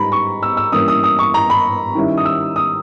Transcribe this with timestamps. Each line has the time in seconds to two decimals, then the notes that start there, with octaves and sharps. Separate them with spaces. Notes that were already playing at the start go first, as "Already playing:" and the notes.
Already playing: G#2 G3 B3 D#4 A#5 B5
0.12 C#6
0.43 E6
0.57 E6
0.72 G2 E3 A#3 C#4 D#6
0.88 D#6
1.04 D#6
1.19 C#6
1.34 A#5
1.50 B5
1.95 D#3 G3 C#4 E4
2.17 D#6
2.25 E6
2.56 D#6